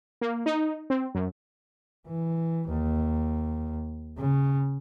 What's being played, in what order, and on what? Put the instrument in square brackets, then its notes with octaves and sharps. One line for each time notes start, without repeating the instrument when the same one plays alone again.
[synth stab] A#3
D#4
C4
F#2
[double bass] E3
D#2
C#3